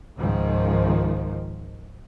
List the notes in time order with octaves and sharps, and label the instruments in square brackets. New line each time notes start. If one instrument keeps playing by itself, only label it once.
[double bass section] C#2 G#2 D#3 F3